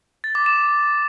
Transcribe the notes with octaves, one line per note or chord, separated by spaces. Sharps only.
A6
D6
E7